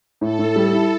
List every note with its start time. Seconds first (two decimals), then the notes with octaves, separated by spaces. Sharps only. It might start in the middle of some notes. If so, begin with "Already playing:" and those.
0.21 A2 A4
0.39 A2
0.56 G3
0.73 E4